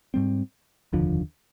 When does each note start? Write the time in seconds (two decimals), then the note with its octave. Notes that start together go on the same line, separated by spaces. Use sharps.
0.14 G#2 G3 C4
0.93 F1 D#2 D3 F3